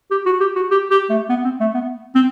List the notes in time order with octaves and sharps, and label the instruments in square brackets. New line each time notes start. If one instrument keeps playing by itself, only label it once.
[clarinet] G4
F#4
G4
F#4
G4
G4
A3
B3
C4
A3
B3
C4